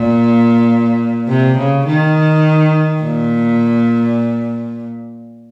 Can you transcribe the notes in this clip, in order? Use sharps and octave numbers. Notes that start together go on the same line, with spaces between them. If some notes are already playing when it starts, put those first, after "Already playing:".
Already playing: A#2
C3
C#3
D#3
A#2